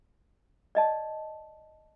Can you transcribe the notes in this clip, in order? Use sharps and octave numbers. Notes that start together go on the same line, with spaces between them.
D5 D#5 A5